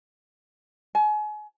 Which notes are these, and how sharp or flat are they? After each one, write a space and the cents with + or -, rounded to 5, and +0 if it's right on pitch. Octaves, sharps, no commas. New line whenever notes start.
G#5 +35